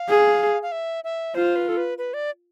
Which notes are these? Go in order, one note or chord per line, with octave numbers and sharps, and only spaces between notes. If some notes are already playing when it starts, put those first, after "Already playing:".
Already playing: F5
G#4
F5
E5
E5
F4 C5
B4
A4
B4
B4
D5